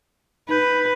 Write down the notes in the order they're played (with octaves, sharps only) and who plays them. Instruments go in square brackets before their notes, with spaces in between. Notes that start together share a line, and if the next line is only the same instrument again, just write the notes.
[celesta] D#4 G6 [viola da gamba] B4